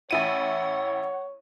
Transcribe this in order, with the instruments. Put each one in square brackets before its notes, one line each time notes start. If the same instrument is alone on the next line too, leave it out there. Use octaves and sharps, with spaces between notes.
[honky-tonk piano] A1 E4 D#7 [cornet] C#5 [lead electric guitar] F#5